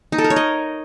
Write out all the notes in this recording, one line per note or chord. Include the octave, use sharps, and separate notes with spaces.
D#4
A4
A#4
C#5
D#5